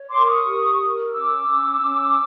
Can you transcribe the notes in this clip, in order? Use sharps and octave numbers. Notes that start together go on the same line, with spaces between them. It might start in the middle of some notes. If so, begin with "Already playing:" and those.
Already playing: C#5
A#4 C6 D6
C#6 D#6
G4
A#4
C#4 D6 E6
C#4
C#4